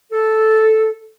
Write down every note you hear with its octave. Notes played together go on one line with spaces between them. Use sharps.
A4